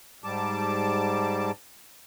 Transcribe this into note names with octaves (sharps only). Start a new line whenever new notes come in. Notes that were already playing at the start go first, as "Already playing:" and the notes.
G#2 G3 A5 D6